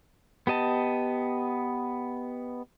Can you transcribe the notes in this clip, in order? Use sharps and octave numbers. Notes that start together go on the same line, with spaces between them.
B3 G4 D#5 A5